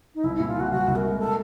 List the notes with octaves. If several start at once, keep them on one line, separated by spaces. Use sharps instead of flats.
D#4
C2 E4
A#2 E4
F4
C2 F#4
C2 F#4
C2
A#4
G#3
A#3 A4